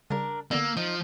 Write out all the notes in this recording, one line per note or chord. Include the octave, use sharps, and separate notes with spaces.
C#3 G3 D4 A#4
D3 A#3 B3 D5 E6
F3 D#4